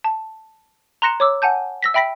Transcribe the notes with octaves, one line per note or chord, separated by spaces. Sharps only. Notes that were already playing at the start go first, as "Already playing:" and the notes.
A5
A#5 C6 F#6 A#6 C#7 E7
C#5 D6 E6
F#5 G#5 A5 G6
E6 A#6 B6
E5 G5 B5 A#6 B6